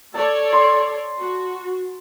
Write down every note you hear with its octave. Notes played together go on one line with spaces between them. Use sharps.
A4 C#5 D5 A5
C6
F#4